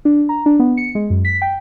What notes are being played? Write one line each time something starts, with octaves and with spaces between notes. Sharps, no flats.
D4
A#5
D4
B3
C#7
G#3
F#2
B6
G5